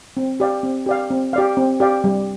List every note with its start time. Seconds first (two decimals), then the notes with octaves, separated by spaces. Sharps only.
0.17 C4
0.40 G4 D5 F5
0.63 C4
0.86 G4 D5 F5
1.11 C4
1.33 G4 D5 F5
1.57 C4
1.80 G4 D5 F5
2.04 G3